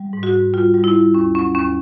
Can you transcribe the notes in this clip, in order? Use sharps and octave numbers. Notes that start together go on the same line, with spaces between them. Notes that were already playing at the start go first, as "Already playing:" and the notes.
Already playing: G3
G#2
F#4
G#2
G3 F4
G3
E4
G3
D#2 C#4
F#3 C#4
D#2 C#4